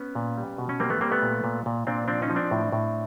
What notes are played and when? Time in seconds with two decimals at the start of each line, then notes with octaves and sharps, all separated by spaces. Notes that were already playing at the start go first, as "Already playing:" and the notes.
Already playing: B3 C#4
0.15 A#2
0.37 G3
0.58 B2
0.69 C#4
0.80 G3 A#3 C4
0.90 A3 B3
1.01 G3 A#3 C4
1.11 A3 B3
1.22 A#2
1.44 A#2
1.66 A#2
1.87 A#2 C4 D4
2.08 F3 C4 D4
2.22 C#4 D#4
2.30 F3
2.36 C4 D4
2.51 A2
2.72 A2